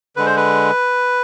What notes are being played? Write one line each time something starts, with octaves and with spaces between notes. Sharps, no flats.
D3 G#3 B4
C5
B4